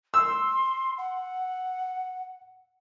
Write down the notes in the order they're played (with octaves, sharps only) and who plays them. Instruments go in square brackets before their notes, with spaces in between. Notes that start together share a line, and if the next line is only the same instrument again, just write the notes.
[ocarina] C6 [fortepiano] E6
[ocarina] F#5